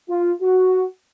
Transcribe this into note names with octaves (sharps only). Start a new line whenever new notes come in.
F4
F#4